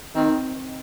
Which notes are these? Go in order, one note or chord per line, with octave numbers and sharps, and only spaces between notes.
D#3 C4